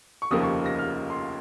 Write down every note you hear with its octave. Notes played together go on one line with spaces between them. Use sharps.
C#6
F1 D#2 C#3 F3 A#3 D#6
C#6
A#6
F6
C6